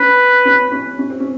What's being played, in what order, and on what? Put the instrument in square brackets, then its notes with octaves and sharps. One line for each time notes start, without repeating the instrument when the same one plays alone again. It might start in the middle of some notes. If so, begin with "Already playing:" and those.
Already playing: [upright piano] C#4 [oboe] B4
[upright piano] C#4
C#4
C#4
C4
C#4